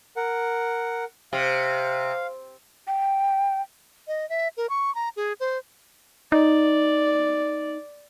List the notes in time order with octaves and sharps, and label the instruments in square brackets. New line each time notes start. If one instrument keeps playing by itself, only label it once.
[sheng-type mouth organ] A#4 F#5
[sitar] C3 [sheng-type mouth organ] F5
[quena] G5
[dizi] D#5
E5
A#4
C#6
A#5
G#4
C5
[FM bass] D#4 [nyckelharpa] D5